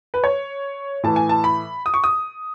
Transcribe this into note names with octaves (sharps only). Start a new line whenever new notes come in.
B4
C#5
A2 E3 A5
G#5
A5
B5
D#6
C#6
D#6